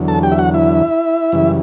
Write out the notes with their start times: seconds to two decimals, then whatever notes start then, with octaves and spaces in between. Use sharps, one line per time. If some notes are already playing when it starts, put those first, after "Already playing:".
Already playing: E2 D3 F#3
0.08 A4 A5
0.23 G4 G5
0.32 E5
0.38 F#4 F#5
0.54 E4 E5
1.32 F#2 C#3 E3 G3